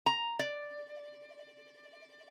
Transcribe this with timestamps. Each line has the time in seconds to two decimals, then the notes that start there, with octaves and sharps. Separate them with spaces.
0.06 A#5
0.39 D5